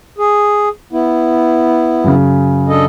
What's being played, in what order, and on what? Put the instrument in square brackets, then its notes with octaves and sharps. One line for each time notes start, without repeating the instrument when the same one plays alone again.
[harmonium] G#4
B3 E4
[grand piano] F#2 C#3
[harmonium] D4 A4 D#5